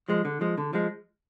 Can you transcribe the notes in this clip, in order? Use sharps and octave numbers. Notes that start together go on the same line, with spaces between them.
F3 G#3
D3
F3 G#3
D3
F3 G#3